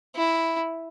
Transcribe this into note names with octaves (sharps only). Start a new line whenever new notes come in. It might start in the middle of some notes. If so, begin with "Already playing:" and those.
E4